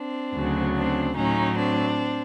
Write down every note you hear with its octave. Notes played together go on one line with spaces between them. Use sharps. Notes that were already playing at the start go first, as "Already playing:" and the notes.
Already playing: C4 D4
D2 C#3 F#3
C4 D4
A2 F#3 C#4 D#4
C4 D4